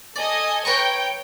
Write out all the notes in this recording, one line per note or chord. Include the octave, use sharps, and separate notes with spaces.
A4 D5 D#5 G#5
B4 C#5 G5 A#5 C#6